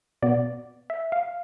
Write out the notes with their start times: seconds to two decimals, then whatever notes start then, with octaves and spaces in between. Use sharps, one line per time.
0.22 B2 B3 D5
0.90 E5
1.12 F5